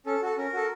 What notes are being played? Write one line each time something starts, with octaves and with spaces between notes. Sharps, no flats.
C#4 A4
F#4 A4
C#4 A#4
F#4 A4